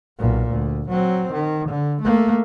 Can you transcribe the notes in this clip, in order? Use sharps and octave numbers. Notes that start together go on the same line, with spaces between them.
B1 A#2
D2
F#3 C4
D#3
D3
A3 A#3